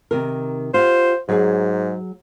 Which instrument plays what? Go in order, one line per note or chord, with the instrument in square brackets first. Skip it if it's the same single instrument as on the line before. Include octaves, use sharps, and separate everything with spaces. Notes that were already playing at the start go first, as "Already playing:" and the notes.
[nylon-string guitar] C3 D#3 A#4
[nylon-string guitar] F4 G4 F#5 [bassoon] C5
[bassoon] G#2 [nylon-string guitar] F#3 G#4